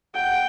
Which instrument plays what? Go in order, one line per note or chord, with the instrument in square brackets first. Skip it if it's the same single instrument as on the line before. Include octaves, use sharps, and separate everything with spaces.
[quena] F#5 [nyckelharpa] G5